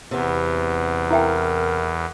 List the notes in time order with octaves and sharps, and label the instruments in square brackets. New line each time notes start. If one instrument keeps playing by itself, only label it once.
[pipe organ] E2 [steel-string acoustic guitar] C3 B3
[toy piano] E4 E5 G5 [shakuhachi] A#4